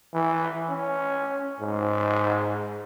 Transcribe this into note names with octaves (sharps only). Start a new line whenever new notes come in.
E3
C#4
G#2